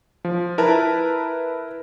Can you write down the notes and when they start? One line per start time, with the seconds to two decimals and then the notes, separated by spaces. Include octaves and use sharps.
0.25 F3
0.58 E4 A#4 B4 A5